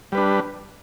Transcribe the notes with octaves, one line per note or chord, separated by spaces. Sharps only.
G3 D4 B4